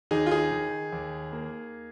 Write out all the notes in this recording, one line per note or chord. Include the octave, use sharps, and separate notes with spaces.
D#2 D#4 G#4
F4
D#4 G#4
D#3
D#2
A#3